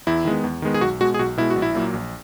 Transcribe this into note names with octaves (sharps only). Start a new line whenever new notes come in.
E2 E4
D#3 G#3 B3
E2
D#3 G#3 B3
G#4
B1 F#4
B2 G#3 F#4
G#4
B1 F#4
B2 G#3 E4
F#4
A#1
E4
A#2 F#3 A#3
A#1